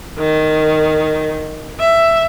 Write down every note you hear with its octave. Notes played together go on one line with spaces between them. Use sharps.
D#3
E5